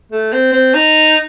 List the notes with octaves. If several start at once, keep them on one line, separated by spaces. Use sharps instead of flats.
A3
C4
C4
D#4